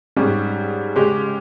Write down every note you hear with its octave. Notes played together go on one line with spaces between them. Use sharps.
G#2 G3 C#4
C#3 G#3 C#4 G4